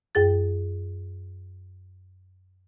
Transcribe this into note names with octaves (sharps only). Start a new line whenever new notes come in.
F#2 G#4 A6